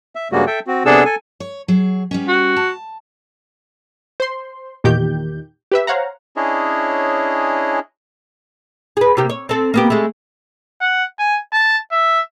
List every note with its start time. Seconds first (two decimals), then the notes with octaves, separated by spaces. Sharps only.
0.15 E5
0.32 G2 C#3 G3 G#3 A#3 F#4
0.47 A4 E5 G5
0.67 C4 F#4
0.85 C3 B3 D4 G#4 A4 E6
1.05 A4 G#5
1.40 C#5
1.68 F#3 G#4
2.11 G3 B3 C#4
2.28 F#4
2.56 A5
4.20 C5 C6
4.84 E2 A#2 D#3 G4 G6
5.72 G4 B4 E5
5.87 C5 C#5 F5 F#5 A#5
6.36 C#4 D4 E4 G#4 C#5 D#5
8.97 G#4 B4
9.17 C3 A#3 G4
9.30 C#5
9.49 C4 A4
9.74 A#3 B3 G4
9.90 G#3 A3
10.81 F#5
11.19 G#5
11.53 A5
11.92 E5